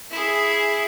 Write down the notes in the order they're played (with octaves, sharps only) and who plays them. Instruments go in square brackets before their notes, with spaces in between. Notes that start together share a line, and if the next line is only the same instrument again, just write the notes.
[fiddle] E4 G#4